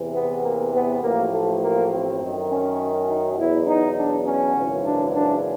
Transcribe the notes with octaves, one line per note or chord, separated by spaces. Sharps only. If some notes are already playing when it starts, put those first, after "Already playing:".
Already playing: E2 C3 E3
B3
A#3
B3
A1 A2 F3 A#3
A3
A#3
C4
F#2 D#3 F#3
C#4
D#4
E2 B2 F#3 E4
D#4
D4
C#4
G#1 F#2 C#3 E3
D4
D4